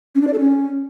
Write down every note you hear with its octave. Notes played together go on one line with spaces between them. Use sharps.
C#4
D4
D5
A4
C#4